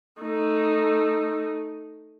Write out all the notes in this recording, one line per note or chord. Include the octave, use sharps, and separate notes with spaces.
A3 D#4